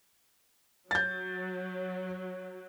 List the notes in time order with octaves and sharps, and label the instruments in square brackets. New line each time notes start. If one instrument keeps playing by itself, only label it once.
[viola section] F#3 [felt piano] G6 A6